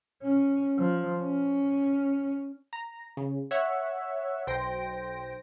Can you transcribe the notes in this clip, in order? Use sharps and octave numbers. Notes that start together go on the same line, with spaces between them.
C#4
F3
C#4
A#5
C#3
C#5 E5 F#5
B1 C5 G5 A#6 D7